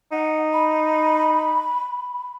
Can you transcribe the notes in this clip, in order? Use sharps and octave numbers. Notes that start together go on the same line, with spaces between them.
D#4 F#5
B5